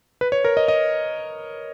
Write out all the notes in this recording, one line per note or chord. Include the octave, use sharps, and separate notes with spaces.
B4
C#5
A#4
D#5
D#5